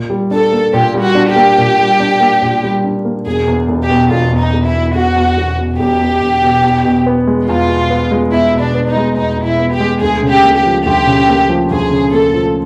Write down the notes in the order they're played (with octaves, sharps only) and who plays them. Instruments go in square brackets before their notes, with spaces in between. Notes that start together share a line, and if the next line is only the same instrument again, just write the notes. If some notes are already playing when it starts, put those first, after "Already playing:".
Already playing: [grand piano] A#2
G3
[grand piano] D4 [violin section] A4
[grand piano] A#3
[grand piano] A#2 [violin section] G4
[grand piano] G3
[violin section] F#4
[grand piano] D4
[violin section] G4
[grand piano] A#3
A#2
G3
D4
A#3
A#2
G3
D4
A#3
[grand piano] E1 [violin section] G#4
[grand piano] E2
E1
[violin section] G4
[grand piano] B2
[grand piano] E1 [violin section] F4
[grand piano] E2
[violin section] D#4
[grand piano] E1
[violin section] E4
[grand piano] B2
[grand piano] E1 [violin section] F#4
[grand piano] E2
E1
B2
[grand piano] E1 [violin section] G4
[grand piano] E2
E1
B2
E2
B2
B3
G#3
[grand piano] E2 [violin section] F4
[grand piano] B2
B3
G#3
[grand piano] E2 [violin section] E4
[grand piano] B2
[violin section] D4
[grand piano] B3
[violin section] D#4
[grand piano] G#3
[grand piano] E2 [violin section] D#4
[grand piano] B2
[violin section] E4
[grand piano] B3
[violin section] G4
[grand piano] G#3
[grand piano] D2 [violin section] G#4
[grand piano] C#3
[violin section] G4
[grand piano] A#3
[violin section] G4
[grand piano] F3
[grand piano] D2 [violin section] G4
[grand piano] C#3
A#3
F3
[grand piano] D2 [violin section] G#4
[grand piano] C#3
[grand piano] A#3 [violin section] A4
[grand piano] F3